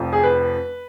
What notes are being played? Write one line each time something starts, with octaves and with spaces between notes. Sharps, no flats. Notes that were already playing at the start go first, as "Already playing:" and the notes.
Already playing: F1 F2 F3
G#4
B4